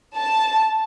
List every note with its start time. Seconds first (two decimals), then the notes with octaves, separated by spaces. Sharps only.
0.16 A5